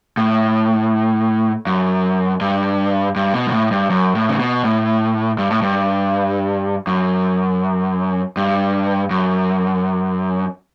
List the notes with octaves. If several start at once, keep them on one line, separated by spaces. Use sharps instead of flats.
A2
F#2
G2
G2
B2
G2
A2
G2
F#2
A2
C#3
B2
A2
G2
A2
G2
F#2
G2
F#2